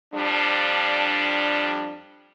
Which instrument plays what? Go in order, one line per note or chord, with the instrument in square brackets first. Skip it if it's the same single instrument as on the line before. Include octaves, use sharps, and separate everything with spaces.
[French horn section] F2 F3 G3 D4